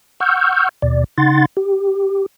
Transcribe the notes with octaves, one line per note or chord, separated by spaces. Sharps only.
F#5 C#6 E6 F6 G6
D#2 B2 D5
C#3 D#4 F#5 C6 A6
G4